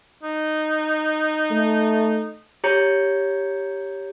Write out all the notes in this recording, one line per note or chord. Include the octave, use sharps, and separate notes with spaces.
D#4
A3
G4 C#5 A#5 G6 C#7